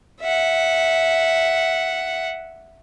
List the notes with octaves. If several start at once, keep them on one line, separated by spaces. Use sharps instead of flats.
E5 F#5